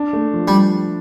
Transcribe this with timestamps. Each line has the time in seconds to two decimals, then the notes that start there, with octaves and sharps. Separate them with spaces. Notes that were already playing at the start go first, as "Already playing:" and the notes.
Already playing: D4
0.13 A3
0.34 F3
0.48 G3